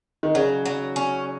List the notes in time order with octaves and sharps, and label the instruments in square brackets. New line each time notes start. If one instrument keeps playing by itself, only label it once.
[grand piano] D#3
[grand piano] C#3 [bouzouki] F#3
[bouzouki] F#3
C#4